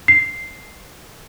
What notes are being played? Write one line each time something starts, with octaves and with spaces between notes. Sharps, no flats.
C7